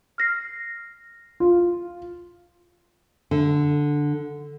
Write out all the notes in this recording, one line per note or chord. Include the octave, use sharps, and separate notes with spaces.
F6 A#6 C7
F4
D3